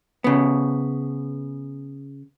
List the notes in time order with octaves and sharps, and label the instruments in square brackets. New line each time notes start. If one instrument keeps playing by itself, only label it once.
[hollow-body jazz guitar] C#3 B3